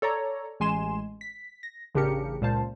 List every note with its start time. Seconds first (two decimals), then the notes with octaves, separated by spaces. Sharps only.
0.02 A4 C#5 D5 A#5
0.60 A1 G#3 G#5 C6 E7
1.21 B6
1.63 A#6
1.95 A1 C#3 D4 G4 A#4 C#7
2.41 C#2 A#2 C5 F5 A5